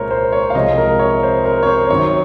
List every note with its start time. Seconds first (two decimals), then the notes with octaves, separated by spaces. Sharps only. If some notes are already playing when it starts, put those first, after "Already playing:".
Already playing: C2 A#2 G#3 A#4 C5 C#5
0.11 C5
0.32 C#5
0.50 F5
0.55 C2 C3 F3 G#3 D#5
0.78 A#4
0.99 C#5
1.23 C5
1.45 A#4
1.63 C#5
1.67 C5
1.90 F#2 D#3 F#3 C#5